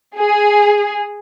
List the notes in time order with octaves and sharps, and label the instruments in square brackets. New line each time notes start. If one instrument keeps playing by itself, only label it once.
[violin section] G#4